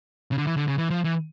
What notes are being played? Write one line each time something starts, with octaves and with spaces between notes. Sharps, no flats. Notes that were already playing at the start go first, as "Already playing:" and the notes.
C#3
D3
E3
D3
C#3
E3
F3
E3